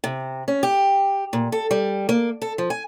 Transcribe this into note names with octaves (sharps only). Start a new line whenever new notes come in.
C3
C#4
G4
A#2
A4
G3
A#3
A4
F3
G#5